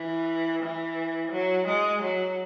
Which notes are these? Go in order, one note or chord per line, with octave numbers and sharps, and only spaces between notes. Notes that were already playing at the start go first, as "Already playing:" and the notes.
Already playing: E3
E3
F#3
G#3
F#3